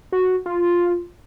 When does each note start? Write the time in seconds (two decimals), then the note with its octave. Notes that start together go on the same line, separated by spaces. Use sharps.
0.12 F#4
0.46 F4